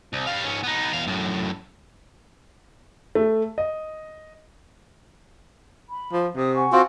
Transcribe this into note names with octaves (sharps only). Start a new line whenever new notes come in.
C2
G3 F5
G#2 C#4
B3 D#4
E2 F5
F#2 A2
A3
D#5
B5
F3
C3 G5 D#6
F#5 G#5 C#6
C4 F4 F#4